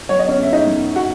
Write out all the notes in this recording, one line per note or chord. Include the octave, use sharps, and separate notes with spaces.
F#3 C#5
D#5
C#4 C#5
C#3 E5
D#4 D#5
F#2
F#4 F#5